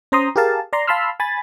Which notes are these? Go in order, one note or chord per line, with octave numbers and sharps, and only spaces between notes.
C#4 C5 A#5 C6 D#6
G4 G#4 A#4 F5 A5
D5 A#5 C6
F5 A5 B5 C6 E6 F6
G#5 B5 A6